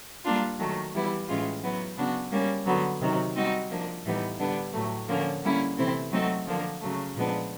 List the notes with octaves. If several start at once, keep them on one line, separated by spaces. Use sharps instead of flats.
G3 A#3 D4 F4
D#3 F#3 A3
E3 G3 B3 E4
A2 E3 G#3 C#4 F4
F#3 B3 E4
C#3 F#3 B3 D4 F#4
G3 A#3 C#4
D3 F#3 B3
C3 D#3 F#3
G3 C4 D#4 F#4
F3 A#3 D4
A2 E3 G3 B3 D#4
D3 G3 B3 D4
A2 F#3 A3
D3 F3 A#3 C#4
D3 G3 A#3 C#4 E4
C3 E3 A3 C4 E4
F#3 A3 C4 D#4 F#4
D3 F3 A#3 D4
C#3 F#3 A3
A#2 F3 G#3 B3 D4